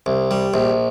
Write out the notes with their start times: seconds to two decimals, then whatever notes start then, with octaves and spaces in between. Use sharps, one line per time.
0.06 C2
0.31 G3
0.54 A#1